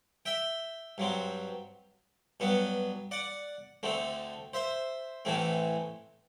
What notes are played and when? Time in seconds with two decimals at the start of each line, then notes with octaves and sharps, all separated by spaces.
0.26 E5 G5
0.98 G2 F#3 C4
2.40 G2 F#3 B3
3.11 D5 F#5
3.83 D2 D3 A3 C4
4.54 C5 E5
5.25 A1 A2 E3 A3 C4